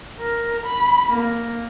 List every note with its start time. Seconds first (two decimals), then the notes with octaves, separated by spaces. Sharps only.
0.20 A#4
0.66 B5
1.10 A#3